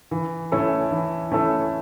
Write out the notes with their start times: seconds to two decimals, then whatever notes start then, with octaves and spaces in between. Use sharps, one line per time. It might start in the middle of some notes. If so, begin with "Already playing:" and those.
0.11 E3
0.52 A3 C#4 E4 A4
0.92 E3
1.32 A3 C#4 E4 A4